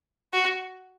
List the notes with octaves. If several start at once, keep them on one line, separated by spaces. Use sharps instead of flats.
F#4